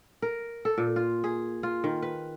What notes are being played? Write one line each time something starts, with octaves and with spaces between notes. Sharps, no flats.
A#4
A4
A#2
F4
G#4
F4
D#3
B4